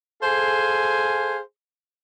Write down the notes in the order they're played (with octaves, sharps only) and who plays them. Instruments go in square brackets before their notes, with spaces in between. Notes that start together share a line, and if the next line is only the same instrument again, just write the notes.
[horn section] G#4 A4 C5 F5 G#5